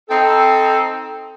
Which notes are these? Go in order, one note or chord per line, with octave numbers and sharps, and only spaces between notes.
C4 D#4 A4